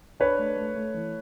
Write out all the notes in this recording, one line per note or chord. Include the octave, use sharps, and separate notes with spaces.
D4 B4 C#5
A3
A3
A3
E3